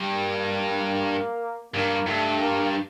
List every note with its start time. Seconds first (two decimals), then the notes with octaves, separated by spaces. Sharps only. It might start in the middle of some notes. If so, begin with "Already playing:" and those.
Already playing: G2
0.11 A#3
1.74 G2 A#3
2.07 G2 A3
2.40 A#3